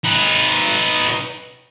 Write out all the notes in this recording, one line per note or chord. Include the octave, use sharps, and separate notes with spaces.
D#4 B4